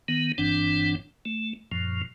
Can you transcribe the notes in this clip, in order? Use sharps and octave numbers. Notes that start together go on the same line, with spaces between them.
D#3 B3
F#1 G2 E3 C4 D4
A3
F#2 A#2 F3